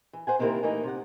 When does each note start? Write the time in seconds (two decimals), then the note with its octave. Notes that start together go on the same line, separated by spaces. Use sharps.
0.13 E3
0.27 C5 F#5 G#5
0.39 C3 D#3 A#3 C4 E4 A#4
0.63 E3 A3 A#3 D#4
0.84 C3 F#5